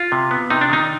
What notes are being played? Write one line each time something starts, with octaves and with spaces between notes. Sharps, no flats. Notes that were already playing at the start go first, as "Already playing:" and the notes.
Already playing: F4
C3
B3
C3 D#4
D4
D#3 D#4